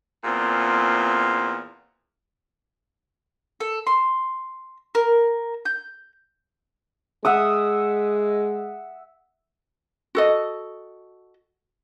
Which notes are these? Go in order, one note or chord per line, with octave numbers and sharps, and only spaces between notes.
E2 A#2 C4
A4
C6
A#4
G6
G#3 E5 F#5 D#6
F#4 A4 D#5